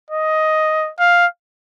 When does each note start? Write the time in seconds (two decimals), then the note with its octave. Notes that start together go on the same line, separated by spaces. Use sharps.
0.11 D#5
1.00 F5